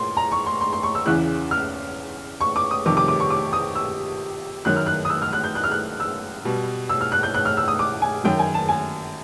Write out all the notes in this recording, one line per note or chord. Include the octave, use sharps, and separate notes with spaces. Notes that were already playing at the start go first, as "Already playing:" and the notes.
Already playing: A#2 C6
A#5
C#6
C6
C6
C6
C#6
E6
E2 C#3 E3 F#6
F6
C#6
D6
D#6
F2 C3 D#3 G3 D6
D6
D6
C#6
D6
D#6
E6
F#2 D#3 F#3 F#6
F6
F#6
D#6
E6
F6
F#6
G6
F#6
F6
F#6
E6
B2 G3
E6
F6
F#6
G6
F#6
F6
E6
D#6
D6
G#5
F#2 D#3 F#3 G5
G#5
A5
G#5